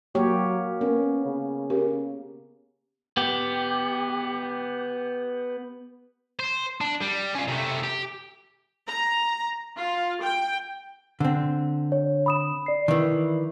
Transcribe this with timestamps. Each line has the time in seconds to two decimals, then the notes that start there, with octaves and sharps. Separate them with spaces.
0.15 F#3 A#3 G4 C#5
0.81 A#3 B3 C#4 A#4
1.25 C#3
1.70 C#4 G4 A#4
3.17 B3 G4
6.40 C5
6.81 D4
7.01 G3
7.35 C#4 F4
7.48 C3 A3
7.83 G4
8.87 A#5
9.77 F4
10.22 G5
11.20 D3 C4
11.92 C#5
12.26 B5 D#6 E7
12.66 D5 C7
12.88 D#3 E3